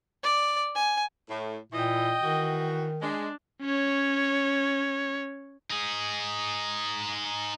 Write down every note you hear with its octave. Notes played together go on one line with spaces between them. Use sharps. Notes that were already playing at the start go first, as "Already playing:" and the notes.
D5
G#5
A2
A#2 E3 E4 D#5 G5
D#3 E3 F#4
G#3 D4
C#4 C#5
D#4 G#4